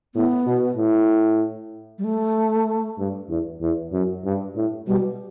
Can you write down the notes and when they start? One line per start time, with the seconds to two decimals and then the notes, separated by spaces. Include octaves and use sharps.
0.15 A2 B3
0.47 B2
0.77 A2
1.98 G3
2.04 A3
2.98 G2
3.29 E2
3.61 E2
3.93 F#2
4.25 G2
4.56 A2
4.87 B2 G3